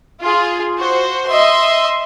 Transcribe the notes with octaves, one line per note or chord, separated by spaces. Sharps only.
F4 G#4
F#4 C5
D#5 E5 C6